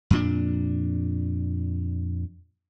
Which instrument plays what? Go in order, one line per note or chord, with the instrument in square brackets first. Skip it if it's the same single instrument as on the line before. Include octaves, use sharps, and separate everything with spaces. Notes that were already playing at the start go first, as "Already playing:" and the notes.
[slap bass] F2 A#2 D4